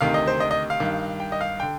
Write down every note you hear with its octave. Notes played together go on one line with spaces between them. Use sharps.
D2 C3 D#3 F5
D#5
C5
D#5
D#5
F5
G2 D#3
G5
D#5
F5
D3 G5